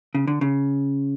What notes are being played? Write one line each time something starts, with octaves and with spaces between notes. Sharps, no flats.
C#3
D3
C#3